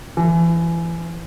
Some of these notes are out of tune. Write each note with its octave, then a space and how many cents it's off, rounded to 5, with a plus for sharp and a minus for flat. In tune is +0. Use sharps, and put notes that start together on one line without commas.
E3 +30